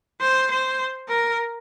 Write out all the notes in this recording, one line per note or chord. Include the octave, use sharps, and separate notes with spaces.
C5
C5
A#4